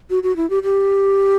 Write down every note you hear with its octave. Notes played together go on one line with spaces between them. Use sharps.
F#4
F#4
E4
G4
G4